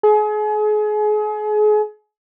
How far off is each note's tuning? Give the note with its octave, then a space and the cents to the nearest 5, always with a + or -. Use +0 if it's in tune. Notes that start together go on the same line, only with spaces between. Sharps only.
G#4 +35